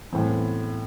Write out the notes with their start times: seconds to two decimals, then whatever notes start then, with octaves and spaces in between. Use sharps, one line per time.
0.12 A2 E3 C4
0.30 B3